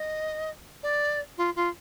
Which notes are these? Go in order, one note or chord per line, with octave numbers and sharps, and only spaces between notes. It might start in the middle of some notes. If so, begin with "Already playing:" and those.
Already playing: D#5
D5
F4
F4